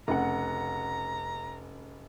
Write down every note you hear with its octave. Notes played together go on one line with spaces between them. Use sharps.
F1 C#3 F#5 A#5